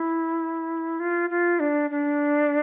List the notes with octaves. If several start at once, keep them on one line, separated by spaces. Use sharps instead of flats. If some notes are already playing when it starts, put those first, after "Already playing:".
Already playing: E4
F4
F4
D4
D4